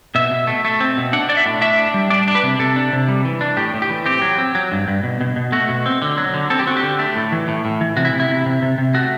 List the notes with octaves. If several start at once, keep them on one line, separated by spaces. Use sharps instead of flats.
B2 E5
B2
A3
A3
C4
B2
D4 F#5
D4 D5
E5
A2
D4 E5
D4
G3
D4 D5
D4
B4
C3
C3 A4
D4
C3
G3
E3
D4
A2 G4
A2
G4
E3
C4 G4
F#3
C4
F#3
G2
G2
B2
B2
B2
A3 F#4
B2
C4
D3
F#3
D3
C4 A4
G4
C4 F#4
G4
D3
A3
A2
E3
A2
A2
E3
C3 F#4
E4
C3
E4
C3
C3
C3
C3
A3 F#4